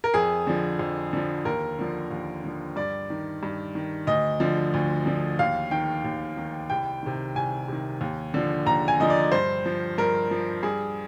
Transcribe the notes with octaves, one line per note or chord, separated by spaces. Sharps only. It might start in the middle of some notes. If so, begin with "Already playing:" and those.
A#4
F2 G#4
D3 F3
F2
D3 F3
D#2 A#4
D3 F3
D#2
D3 F3
G2 D5
D#3
G2
D#3
D2 D#5
D3 F3
D2
D3 F3
D#2 F5
D#3 G5
D#2
D#3
C2 G5
C3 D#3
C2 G#5
C3 D#3
D#2
D3 F3
D#2 A#5
G#5
D3 F3 D#5
D5
G2 C5
F3
G2 A#4
F3
G2 G#4